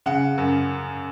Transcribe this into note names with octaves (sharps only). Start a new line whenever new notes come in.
C#3 F#5
F#2